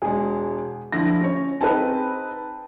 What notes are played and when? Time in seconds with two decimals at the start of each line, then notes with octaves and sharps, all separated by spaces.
0.02 E1 G#3 G#4
0.92 D3 F3 E4 A#6
1.21 C#4 C#5
1.61 C4 D#4 G#4 B4 G5 A5